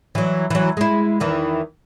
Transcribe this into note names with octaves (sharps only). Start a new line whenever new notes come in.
E3 F#3
E3 F#3
G#3 E4
E2 D#3 E3